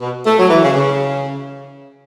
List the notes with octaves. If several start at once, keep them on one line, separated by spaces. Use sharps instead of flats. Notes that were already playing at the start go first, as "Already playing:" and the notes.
B2
A3
F#3
E3
C#3
C#3